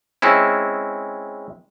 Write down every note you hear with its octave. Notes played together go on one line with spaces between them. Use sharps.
G#3 C4 C#4 E4